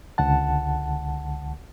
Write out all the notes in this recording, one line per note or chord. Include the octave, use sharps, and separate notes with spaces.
C#2 D3 F#5 A5